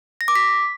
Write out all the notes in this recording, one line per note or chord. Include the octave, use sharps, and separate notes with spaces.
A#6
D6
B6